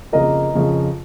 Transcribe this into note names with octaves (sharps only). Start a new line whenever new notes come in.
F2 C#3 A#3 A#4 D#5
F2 C#3 F3